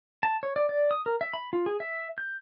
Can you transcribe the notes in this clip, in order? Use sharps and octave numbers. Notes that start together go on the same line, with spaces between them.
A5
C#5
D5
D5
D#6
A#4
E5
B5
F4
G#4
E5
G6